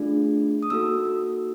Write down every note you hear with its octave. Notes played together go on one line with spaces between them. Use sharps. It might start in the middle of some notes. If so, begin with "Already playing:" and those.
Already playing: A3 D4 F4 G#4
D#6
A#3 D#4 F#4 A4 E6